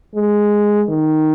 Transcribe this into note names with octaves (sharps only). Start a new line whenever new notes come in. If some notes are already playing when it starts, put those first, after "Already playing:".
G#3
D#3